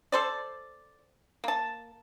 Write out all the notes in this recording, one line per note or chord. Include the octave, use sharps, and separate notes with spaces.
A4 C5 D5
A#3 A5